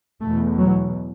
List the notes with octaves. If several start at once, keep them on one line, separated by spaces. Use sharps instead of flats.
E2 B2 A3
F#3